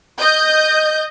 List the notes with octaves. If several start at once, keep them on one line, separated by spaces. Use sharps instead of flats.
D#5 G6